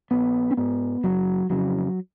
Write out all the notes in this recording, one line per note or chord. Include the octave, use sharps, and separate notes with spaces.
A#1 B3
C#4
G#2 B3
F#1 F#3
F2 C#3 F#3